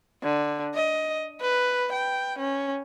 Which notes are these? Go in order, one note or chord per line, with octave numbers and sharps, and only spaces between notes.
D3
D#5
B4
G5
C#4